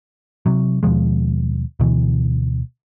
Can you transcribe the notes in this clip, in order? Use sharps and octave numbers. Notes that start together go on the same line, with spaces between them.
C3 F#3
D#2 B2 F3 G#3
D2 B2 E3